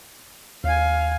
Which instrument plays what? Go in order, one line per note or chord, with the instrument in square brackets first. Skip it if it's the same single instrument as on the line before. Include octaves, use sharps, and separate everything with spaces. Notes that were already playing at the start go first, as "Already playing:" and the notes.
[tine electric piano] D#2 [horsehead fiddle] F5 G#5